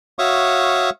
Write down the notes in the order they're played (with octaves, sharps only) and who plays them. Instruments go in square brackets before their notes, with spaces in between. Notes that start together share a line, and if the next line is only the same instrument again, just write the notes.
[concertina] F#4 C#5 E5 F5 C#6 D#6